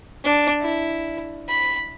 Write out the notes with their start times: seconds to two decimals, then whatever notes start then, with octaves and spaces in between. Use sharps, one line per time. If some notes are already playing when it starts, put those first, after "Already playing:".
0.24 D4
0.62 E4
1.49 B5